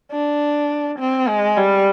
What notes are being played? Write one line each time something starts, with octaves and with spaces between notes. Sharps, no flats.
D4
C4
G#3
G3